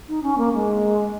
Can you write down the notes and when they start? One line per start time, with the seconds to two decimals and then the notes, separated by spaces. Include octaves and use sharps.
0.09 D#4
0.23 C#4
0.38 A#3
0.53 G#3